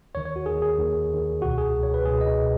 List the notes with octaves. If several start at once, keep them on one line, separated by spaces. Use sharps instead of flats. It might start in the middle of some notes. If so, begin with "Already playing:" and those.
D#2 D#3 C#5
C#5
F#4
D#2 D#3 G#4
G#4
D#2 D#3
D#2 D#3
C#2 B2 F#4
G#4
C#2 B2
C#5
B4
C#2 B2 G#4
D#5
B2